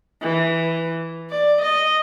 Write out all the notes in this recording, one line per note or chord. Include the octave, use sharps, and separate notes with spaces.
E3
D5
D#5